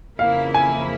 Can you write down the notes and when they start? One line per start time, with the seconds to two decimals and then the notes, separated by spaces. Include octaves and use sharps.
0.19 F2 C#3 E3 A#3 E4 F5
0.54 G#5